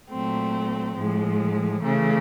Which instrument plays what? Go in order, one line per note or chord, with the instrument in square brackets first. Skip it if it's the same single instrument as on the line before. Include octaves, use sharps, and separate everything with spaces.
[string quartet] A#2 F#3 A3 C4
A2 F3 G#3
C#3 E3 A3